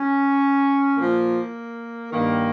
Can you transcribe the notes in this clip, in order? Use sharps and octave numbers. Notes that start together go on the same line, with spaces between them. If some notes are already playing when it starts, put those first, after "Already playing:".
Already playing: C#4
A#2 F3 A#3
G2 D#3 A#3